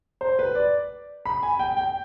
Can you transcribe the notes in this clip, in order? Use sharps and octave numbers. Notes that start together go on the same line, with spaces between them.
C5
B4
D5
B5
G#5
G5
G5